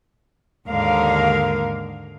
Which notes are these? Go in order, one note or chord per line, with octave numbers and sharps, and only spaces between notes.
D#2 G#2 D3 A#3 A#4 F5